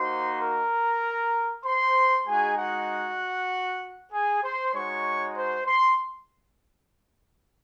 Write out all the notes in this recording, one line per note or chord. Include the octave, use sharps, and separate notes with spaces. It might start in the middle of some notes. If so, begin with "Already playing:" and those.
Already playing: A#3 D#4 F#4 C5 C6
A#4 A#5
C5 C6
G#3 D#4 F#4 G#4 G#5
F#4 F#5
G#4 G#5
C5 C6
G#3 D#4 F#4 C#5 C#6
C5 C6
C6